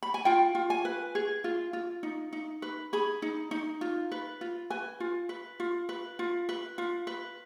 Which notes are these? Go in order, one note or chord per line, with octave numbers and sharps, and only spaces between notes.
B5
G#5
F4 G5
F4
G#5
B4
G#4
F4
F4
D#4
D#4
B4
G#4 B5
D#4
D#4
F4
B4
F4
B4 G#5
F4
B4
F4
B4
F4
B4
F4
B4